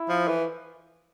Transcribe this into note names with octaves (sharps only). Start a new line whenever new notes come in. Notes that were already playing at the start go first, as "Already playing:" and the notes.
Already playing: E4
F3
E3